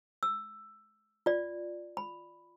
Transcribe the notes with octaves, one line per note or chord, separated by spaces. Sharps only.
E6
F4 D5
B5